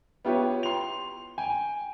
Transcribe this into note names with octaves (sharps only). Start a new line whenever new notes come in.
B3 E4 F4 G4 B4 C#5
C6 F7
G5 G#5